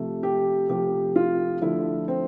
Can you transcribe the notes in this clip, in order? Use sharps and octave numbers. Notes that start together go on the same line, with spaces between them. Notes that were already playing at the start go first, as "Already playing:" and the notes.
Already playing: C3 F3 A3
G4
C3 F3 A3 G4
F4
D3 F3 A3 E4
C4